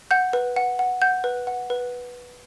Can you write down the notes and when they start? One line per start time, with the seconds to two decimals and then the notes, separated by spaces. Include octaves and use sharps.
0.11 F#5 G6
0.33 B4
0.56 F#5
0.79 F#5
1.02 F#5 G6
1.24 B4
1.47 F#5
1.70 B4